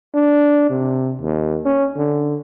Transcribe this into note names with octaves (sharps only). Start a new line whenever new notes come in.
D4
C3
D#2
C#4
D3